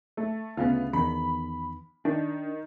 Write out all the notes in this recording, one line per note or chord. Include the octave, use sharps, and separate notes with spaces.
A3
D2 C#3 B3 F4
E2 D#3 B5
D#3 D4